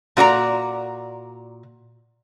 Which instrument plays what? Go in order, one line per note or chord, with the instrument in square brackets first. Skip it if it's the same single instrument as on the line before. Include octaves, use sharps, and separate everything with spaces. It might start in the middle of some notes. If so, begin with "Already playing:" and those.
[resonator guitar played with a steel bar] A#2 F#4 D5 A#5